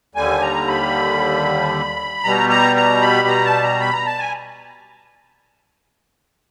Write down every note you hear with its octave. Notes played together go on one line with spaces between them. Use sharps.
D#2 D3 G3 G#5
A#5
B5
B2 G3 A#5
A#5
A#5
B5
A#5
A5
A#5
B5
A#5
A5
G#5